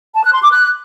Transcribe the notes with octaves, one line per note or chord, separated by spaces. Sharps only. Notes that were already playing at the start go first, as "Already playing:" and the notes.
A5
F#6
C6
D6
F#6